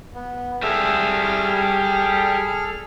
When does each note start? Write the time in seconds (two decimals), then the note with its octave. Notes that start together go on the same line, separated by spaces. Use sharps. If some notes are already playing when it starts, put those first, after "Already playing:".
0.14 B3
0.63 G3 G#4 A4 E5 F6